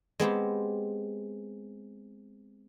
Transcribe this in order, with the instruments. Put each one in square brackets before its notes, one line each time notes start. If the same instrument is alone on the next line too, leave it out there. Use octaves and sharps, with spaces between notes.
[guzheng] G#3 B3 C4 G4